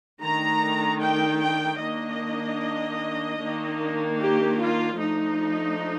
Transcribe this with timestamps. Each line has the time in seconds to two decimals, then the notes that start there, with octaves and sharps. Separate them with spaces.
0.22 D#3 A3 D4 A#5
1.01 G5
1.41 G5
1.81 D#3 A#3 D4 D#5
3.40 D#3 A#3 D4
4.20 G4
4.59 F4
5.00 F3 A3 D4 D#4